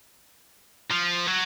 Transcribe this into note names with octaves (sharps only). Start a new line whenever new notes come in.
F3
F#3